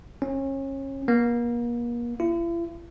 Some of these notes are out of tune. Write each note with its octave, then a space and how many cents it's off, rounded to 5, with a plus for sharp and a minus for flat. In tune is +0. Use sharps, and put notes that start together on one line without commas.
C#4 -30
A#3 +35
E4 +45